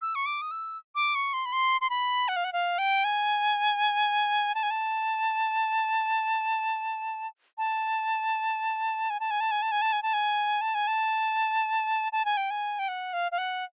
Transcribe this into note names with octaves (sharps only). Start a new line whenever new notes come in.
E6
C#6
D6
D#6
E6
D6
C#6
C6
B5
C6
C6
B5
F#5
F5
F#5
F5
G5
G#5
A5
G#5
A5
A5
G#5
A5
G#5
A5
G#5
A5
G#5
A5
G#5
A5
G#5
A5
G#5
A5
A5
G#5
G5
G#5
G5
F#5
F5
F5
F#5